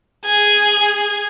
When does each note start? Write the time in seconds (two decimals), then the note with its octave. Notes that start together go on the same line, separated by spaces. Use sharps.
0.24 G#4 G#6